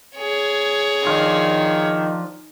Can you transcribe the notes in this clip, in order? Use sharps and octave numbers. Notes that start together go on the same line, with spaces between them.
G#4 C#5
D#3 F3 D4 F4